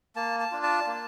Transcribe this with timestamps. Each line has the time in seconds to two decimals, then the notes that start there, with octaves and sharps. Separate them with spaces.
0.16 A#3 A5
0.40 A5
0.52 D4 F4
0.63 A5
0.87 A#3